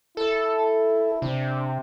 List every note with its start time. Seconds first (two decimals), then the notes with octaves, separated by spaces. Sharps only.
0.17 E4 A4
1.22 C3 D4